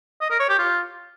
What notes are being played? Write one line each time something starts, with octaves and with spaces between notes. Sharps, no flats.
D#5
A#4
C#5
G4
F4